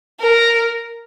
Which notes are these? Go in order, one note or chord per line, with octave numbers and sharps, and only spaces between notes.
A#4